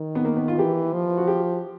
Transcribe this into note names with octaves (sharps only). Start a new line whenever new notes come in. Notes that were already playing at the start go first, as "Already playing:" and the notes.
Already playing: D#3
B3
A#3
B3
F4
E3 G4
F3
F#4
G4